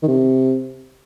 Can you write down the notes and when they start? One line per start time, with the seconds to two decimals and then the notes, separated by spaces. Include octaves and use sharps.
0.03 D#3
0.08 C3